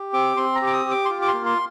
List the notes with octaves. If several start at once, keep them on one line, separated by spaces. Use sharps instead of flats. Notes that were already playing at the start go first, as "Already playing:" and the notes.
Already playing: G4
C4 D6
C4 C6
A#5
G4 D6
D#6
G4
D6
C6
F4 D6
D6
C6
A#3
C6